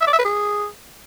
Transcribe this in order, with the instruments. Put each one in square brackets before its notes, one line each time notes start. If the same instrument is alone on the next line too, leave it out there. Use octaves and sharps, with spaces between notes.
[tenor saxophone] E5
D5
E5
B4
G#4